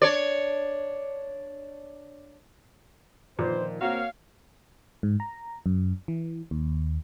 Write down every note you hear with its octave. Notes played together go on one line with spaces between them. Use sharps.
D4 C#5 D5
A#2 D3 D#3 F3 B4 C5
A#3 C4 F#4 A#4 C#5 F5
G#2
A#5
F#2
E3
D#2